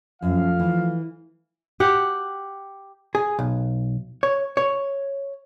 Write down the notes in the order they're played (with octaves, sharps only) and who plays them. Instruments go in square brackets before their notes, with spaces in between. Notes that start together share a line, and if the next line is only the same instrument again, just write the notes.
[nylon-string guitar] F#2 [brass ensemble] F3 A3 F5
[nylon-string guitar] E3
[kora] G4 F#5
[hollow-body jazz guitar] G#4
B1
C#5
C#5